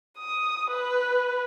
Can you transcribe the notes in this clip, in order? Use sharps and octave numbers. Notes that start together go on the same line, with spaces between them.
D#6
B4